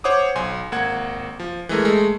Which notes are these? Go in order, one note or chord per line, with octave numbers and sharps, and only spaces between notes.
C5 C#5 F#5 D6 D#6
B1 G#5 C6
G#1 A#3 F#5 G#6
F3
E3 G#3 A3 A#4
G#3 A3